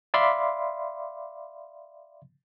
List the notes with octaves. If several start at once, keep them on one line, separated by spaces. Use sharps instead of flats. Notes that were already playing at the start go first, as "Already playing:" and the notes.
D5 E5 F5 B5 C6 D6